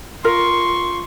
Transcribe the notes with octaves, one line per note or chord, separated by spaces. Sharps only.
F4 A#4 C6 C#6